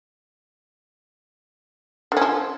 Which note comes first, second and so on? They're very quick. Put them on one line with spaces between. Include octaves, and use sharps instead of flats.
D3 C#4 F3